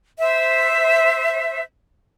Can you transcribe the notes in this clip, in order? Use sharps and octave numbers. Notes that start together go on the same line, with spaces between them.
C5 E5